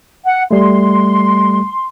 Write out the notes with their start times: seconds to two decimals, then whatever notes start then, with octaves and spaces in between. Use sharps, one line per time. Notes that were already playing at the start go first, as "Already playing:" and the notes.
0.24 F#5
0.51 G3 A3 C6